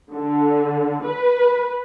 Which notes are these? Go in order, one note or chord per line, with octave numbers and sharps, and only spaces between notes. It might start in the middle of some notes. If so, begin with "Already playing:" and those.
D3
B4